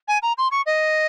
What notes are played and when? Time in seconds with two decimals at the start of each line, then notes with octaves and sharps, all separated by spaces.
0.08 G#5
0.22 A#5
0.38 C6
0.51 C#6
0.66 D#5